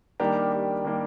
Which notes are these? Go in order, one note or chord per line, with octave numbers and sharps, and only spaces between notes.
D#3 G3 A#3 D4 G4 A#4
G4
D#3 G3 A#3 D4